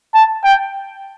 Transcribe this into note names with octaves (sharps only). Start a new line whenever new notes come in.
A5
G5